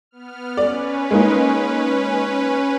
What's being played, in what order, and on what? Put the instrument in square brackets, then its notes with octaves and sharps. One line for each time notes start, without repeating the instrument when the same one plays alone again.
[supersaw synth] B3 F6
[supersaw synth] C#4 B4 [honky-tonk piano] D5
[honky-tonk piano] G#3 A#3 D#4